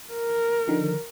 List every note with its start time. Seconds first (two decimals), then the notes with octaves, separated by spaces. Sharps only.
0.12 A#4
0.68 D3 D#3 F3